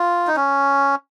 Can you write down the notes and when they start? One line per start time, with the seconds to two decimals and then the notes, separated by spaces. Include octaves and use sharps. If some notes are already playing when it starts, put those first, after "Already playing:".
Already playing: F4
0.27 D#4
0.36 C#4